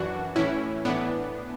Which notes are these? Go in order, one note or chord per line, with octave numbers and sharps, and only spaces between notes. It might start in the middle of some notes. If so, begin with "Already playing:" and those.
Already playing: F#2 E3 D4 F#4
A2 E3 C#4 E4
A2 E3 B3 D4